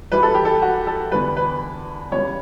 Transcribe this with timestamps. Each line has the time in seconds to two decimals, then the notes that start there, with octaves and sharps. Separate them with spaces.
0.12 F#2 E3 G3 B4
0.23 A4
0.34 G4
0.45 A4
0.62 F#4
0.87 A4
1.11 E2 D3 G3 B4
1.37 B4
2.12 E2 C#3 G3 C#5